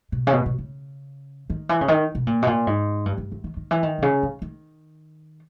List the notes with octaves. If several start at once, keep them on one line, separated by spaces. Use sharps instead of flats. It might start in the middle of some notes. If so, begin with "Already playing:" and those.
B2
C#3
B2
B2
C#3
D#3
E3
C#3
D#3
B2
A#2
B2
A#2
G#2
G2
G2
E2
D#3
D#3
E3
D#3
B2
C#3
D#3
D#3